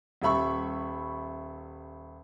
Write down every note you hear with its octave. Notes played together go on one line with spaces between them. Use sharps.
D#1 G3 E5 B5 C#6